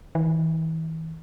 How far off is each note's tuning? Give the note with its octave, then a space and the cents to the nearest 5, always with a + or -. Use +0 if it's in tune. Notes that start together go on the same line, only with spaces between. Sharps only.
E3 -40